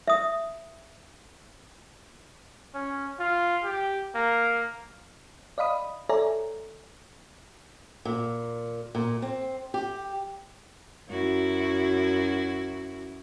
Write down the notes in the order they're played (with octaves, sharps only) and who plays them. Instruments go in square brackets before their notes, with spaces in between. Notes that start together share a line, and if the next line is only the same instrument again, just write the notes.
[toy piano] E5 D#6
[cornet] C#4
F4
G4
A#3
[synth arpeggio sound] D5 D#5 F5 B5 D#6
A4 C#5 D5 E5 G#5 A#5
[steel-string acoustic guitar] A#2
A#2
C4
G4
[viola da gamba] F#2 E4 F#4